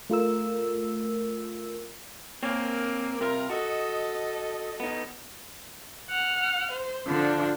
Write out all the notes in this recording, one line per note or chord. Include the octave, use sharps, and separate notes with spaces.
A3 F4 A#4 E6
A#3 C4 C#5
C3 G3 F4 A#4
F#4 A4 D#5
B3 D#4
F#5 F6
C5
D3 F3 D4